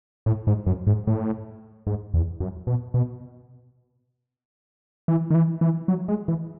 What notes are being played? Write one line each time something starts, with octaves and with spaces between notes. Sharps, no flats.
A2
G#2
F#2
G#2
A2
G#2
E2
F#2
B2
B2
E3
D#3
E3
E3
F#3
G#3
E3